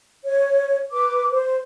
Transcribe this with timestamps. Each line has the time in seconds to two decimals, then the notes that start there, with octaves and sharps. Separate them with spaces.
0.25 C#5
0.92 B4 D6
1.31 C5